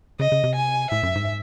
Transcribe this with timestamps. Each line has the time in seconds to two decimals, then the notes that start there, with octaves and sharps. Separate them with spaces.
0.20 C#3 D#5
0.32 C#3
0.44 C3
0.55 G#5
0.91 A2 E5
1.03 F#2
1.15 G#2